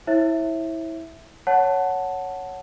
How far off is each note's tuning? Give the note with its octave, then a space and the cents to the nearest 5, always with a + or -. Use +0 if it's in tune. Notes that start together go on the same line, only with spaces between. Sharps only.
E4 -20 C#5 -40 E5 +0
C#5 +0 F#5 +0 A5 +0